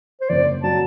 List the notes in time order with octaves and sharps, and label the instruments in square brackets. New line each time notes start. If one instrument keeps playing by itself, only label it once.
[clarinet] C5
[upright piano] F#1 [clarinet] D5
[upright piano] F#3 [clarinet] A5